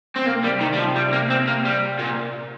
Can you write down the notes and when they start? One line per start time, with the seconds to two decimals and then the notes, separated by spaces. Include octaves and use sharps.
0.16 C4
0.26 C3 A#3
0.44 G3
0.61 D#3
0.73 G3
0.78 F3
0.96 G3
1.13 A#3
1.30 C4
1.47 A#3
1.65 G3
1.99 A#2